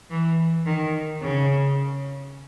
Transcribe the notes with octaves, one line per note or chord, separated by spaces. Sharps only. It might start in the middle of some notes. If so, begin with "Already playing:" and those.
E3
D#3
C#3